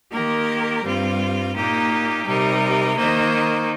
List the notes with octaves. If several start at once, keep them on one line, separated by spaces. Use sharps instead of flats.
D#3 A#3 G4 A#4
G2 G3 C4 F4
A#2 A#3 D#4 G4
C3 G3 D#4 A#4
D#3 A#3 D#4 C5